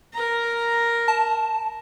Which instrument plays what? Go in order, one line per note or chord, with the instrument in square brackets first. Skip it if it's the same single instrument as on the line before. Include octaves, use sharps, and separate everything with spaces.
[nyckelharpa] A#4 A#5
[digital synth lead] A5